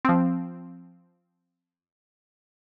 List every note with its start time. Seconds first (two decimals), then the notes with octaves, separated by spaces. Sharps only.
0.05 F3 C4